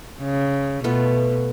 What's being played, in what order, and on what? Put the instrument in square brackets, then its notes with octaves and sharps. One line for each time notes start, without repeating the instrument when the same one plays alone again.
[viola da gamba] C#3
[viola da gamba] B2 [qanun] A3 B3 F4